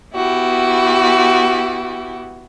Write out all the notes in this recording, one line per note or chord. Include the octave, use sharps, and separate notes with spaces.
B3 E4 F#4 G4